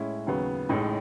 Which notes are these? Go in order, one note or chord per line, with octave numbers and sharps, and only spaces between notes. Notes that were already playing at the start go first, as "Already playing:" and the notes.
Already playing: A2 G#3 C#4 E4
D#2 C#3 F#3 B3
A1 A2 G#3 D#4